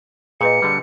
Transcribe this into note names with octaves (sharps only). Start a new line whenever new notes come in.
A#2 G#4 B4 D#5 C#7
D3 G3